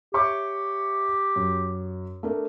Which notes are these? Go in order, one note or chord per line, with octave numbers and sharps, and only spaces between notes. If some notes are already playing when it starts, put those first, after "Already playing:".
G4 C#5 E5 C#6
F#2
A3 D4 A#4